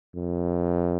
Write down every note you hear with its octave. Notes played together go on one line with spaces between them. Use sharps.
F2